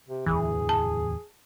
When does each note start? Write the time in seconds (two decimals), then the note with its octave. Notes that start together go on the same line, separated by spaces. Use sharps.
0.08 C3
0.26 D1 G1 E2 E3 G#4
0.69 A5